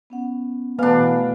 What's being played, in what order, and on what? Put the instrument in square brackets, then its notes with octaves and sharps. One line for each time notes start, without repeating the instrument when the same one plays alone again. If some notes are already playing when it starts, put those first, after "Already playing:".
[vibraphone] B3 C#4 F#5
[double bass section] B2 E3 A3 [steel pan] B3 [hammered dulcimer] D4 F5 [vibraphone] G#5 B5